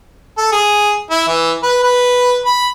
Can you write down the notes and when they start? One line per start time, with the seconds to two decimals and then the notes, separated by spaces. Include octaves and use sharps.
0.38 A4
0.52 G#4
1.10 E4
1.28 E3
1.63 B4
1.83 B4
2.46 B5